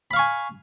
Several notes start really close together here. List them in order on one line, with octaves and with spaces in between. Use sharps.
B5 F5 C#6 G#5